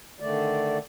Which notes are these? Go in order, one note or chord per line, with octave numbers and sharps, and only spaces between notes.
D3 D#3 A3 D5